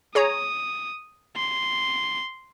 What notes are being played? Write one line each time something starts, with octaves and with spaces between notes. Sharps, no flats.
G#4 C#5 A#5 D#6
C6